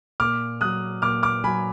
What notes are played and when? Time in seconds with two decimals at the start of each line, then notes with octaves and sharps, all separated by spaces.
0.20 A#2 D6 F6
0.61 F#3 D#6 F#6
1.02 A#2 D6 F6
1.23 D6 F6
1.44 F#3 G#5 B5